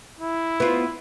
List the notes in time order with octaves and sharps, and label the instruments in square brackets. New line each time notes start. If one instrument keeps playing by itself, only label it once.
[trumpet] E4
[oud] B3 F4